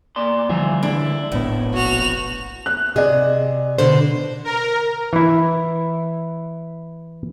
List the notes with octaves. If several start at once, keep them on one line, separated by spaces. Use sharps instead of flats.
A#2 D5 C6
D3 E3 F3 G3 E5 F5
D3 G#3 D4 E4
F1 A#1 A2 B3
F#4 F7
F#6
C3 G#4 D5 D#5
B2 D3 C5
A#4
E3 E4